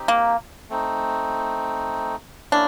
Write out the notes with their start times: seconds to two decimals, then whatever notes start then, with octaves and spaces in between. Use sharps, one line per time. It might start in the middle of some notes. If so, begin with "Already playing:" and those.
Already playing: C4 D#4 G4
0.08 A#3
0.70 A3 C4 D#4
2.52 A#3 C#4 D4 E4